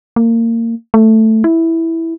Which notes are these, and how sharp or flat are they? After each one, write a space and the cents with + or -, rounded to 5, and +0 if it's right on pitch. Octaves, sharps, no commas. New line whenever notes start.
A#3 -25
A3 +5
E4 -5